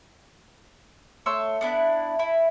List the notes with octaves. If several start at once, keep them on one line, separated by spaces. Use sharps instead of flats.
A3 C#5 C6 E6
B3 D4 E4
E4